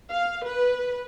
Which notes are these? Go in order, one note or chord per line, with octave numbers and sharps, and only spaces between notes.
F5
B4